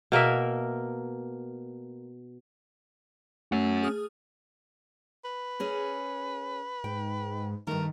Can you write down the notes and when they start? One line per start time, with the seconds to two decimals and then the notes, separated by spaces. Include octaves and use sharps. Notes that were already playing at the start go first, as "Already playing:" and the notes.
0.12 B2 A#3 A#4 E5
3.52 A3 C#4 F#4
3.83 G#4 D#6 F6
5.25 B4
5.60 C#4 G#4 A#4
6.84 G#2 G5
7.67 G2 D#3 A3 A#4